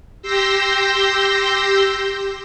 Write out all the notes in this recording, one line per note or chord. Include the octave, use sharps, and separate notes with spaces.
G4 C6 E6 G6 A#6